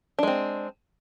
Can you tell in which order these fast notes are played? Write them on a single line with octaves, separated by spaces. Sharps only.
D4 G#3 C4